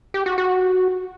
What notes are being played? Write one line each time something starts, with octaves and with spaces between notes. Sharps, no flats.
G4
F#4
F#4